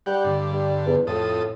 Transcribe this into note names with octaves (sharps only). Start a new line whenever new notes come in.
G3 G4 F#5
G2 D3
G3
E2
F2 A2 A4 D#6